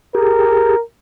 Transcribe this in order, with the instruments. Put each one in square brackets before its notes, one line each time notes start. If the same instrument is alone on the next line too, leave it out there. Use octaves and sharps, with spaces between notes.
[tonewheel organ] G4 G#4 [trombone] A#4